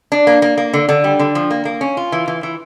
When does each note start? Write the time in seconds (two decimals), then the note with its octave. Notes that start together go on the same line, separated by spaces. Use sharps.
0.12 D4
0.27 A#3
0.42 A#3
0.57 A#3
0.73 D3
0.89 D3
1.04 G3
1.19 D3
1.35 F3
1.51 A#3
1.65 A#3
1.81 C#4
1.97 F4
2.12 E3
2.28 E3
2.43 E3